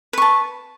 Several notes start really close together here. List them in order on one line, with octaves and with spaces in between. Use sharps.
B4 C#6 A5